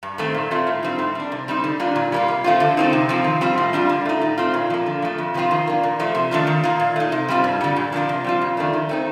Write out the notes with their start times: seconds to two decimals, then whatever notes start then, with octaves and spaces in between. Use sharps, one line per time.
0.03 G2
0.18 D#3 A3 C4
0.34 A#2
0.51 A3 C4 F4
0.67 A2
0.83 G3 C4 D#4
0.99 A2
1.15 G3 D4
1.32 C3
1.48 G3 C4 D#4
1.64 D3
1.80 G3 A#3 D4 F4
1.96 A#2
2.12 G3 A#3 F4
2.28 C3
2.44 F3 A3 C4 F4
2.60 D3
2.77 A3 C4 D#4
2.93 C3
3.09 F3 C4 F4
3.24 D#3
3.41 G3 C4 F4
3.58 A2
3.73 G3 D4 F4
3.89 D3
4.05 A3 D#4
4.21 A2
4.38 A3 C4 F4
4.54 A#2
4.70 F3 A#3
4.86 D3
5.02 F3 A3
5.18 F2
5.34 C3 F3 C4 F4
5.51 D#3
5.67 A#3 D4
5.83 A#2
5.99 F3 A3
6.15 C3
6.31 D#3 A3 D4 F4
6.47 D#3
6.64 A#3 F4
6.80 A#2
6.96 A3 D#4
7.12 C3
7.28 G3 C4 F4
7.44 G2
7.61 D3 G3
7.76 A#2
7.92 F3 A#3 D4 F4
8.09 C3
8.24 G3 C4 F4
8.42 F2
8.57 D#3 A3 D4
8.73 D#3
8.89 A3 C4 D#4